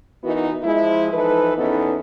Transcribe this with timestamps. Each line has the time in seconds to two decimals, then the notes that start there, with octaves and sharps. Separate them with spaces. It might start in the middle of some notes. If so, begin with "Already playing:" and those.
0.23 E3 B3 D#4 E4 F#4 A#4
0.64 F3 G#3 E4
1.13 E3 F3 D#4 A4 B4
1.56 E2 B3 C#4 D#4 E4 A4